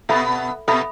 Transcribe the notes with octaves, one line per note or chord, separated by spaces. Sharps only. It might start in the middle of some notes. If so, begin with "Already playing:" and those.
B2 B3 A4 E5 B5
B2 B3 A4 E5 B5